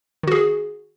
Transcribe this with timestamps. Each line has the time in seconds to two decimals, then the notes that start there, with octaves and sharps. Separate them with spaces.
0.23 D#3
0.27 F#4
0.32 G#4